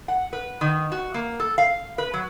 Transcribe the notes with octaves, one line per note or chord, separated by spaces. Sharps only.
F#5
B4
D#3
F#4
A#3
A4
F5
B4
F#3